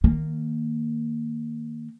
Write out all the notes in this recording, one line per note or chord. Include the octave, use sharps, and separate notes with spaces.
D#3 A#3